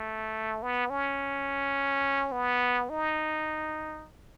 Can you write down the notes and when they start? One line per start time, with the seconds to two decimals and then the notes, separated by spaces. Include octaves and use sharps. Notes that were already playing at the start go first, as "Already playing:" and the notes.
Already playing: A3
0.62 B3
0.90 C#4
2.32 B3
2.90 D#4